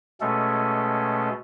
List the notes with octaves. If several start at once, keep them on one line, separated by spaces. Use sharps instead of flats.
B2 G#3 A3 C#4 A4